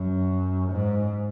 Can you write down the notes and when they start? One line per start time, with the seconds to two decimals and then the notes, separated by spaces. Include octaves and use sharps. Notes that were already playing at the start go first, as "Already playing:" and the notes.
Already playing: F#2
0.72 G#2